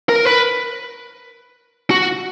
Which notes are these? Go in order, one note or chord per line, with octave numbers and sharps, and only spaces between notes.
A#4
B4
F#4